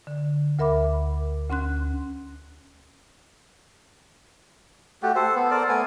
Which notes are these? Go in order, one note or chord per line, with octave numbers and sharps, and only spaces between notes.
D3
D2 A#4 E5 B5 D6
D2 C#4 C6 F#6
A3 F#4 G4
A4 C5
B3
A4 A#4 C5 D5
A3 B3 G#5